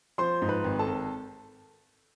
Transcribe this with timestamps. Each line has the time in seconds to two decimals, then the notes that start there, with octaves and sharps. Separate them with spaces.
0.18 F3 C5 C6
0.42 G#2
0.49 B4 B5
0.64 G#1
0.79 A4 A5
0.87 G#1